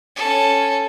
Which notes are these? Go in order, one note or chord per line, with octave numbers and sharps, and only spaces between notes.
C#4 A4